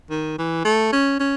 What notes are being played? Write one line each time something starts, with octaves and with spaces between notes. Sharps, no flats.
D#3
E3
A3
C#4
C#4